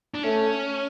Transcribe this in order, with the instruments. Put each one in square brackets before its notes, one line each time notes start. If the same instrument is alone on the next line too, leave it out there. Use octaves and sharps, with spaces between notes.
[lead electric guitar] D4
[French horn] A3 [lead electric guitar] C#4